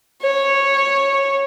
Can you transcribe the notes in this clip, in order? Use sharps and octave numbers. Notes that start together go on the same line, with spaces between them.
C#5